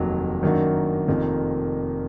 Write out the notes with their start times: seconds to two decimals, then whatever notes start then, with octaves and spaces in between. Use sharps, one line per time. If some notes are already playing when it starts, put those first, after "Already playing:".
Already playing: F1 D#2 D#3 F#3
0.43 F#2 D#3 A#3 D4 F#4
1.08 F1 F2 D#3 A#3